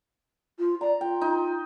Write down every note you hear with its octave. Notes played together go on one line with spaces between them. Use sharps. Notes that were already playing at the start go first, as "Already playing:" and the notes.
F4
D5 A#5
F4 G5
D#4